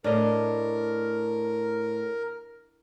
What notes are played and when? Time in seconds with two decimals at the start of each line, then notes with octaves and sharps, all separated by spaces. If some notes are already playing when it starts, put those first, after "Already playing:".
0.04 A2 D4 A#4 D#5 F5